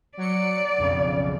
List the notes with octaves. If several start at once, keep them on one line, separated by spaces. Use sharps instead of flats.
F#3 D5 C#7
B1 F2 C#3